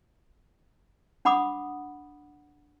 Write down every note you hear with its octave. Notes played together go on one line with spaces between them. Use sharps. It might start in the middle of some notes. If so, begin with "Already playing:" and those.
D4 F#5 B5 D6 D#6